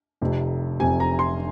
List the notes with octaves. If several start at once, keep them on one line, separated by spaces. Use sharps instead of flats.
F1 F2 C3
F1 F2 C3 G#5
A#5
C6